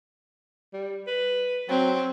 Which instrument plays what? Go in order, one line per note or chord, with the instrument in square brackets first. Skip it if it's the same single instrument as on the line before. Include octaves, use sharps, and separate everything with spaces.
[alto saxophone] G3
B4
[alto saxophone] F#3 [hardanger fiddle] C4